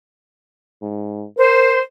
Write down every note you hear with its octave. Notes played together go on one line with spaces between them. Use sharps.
G#2
A#4 C5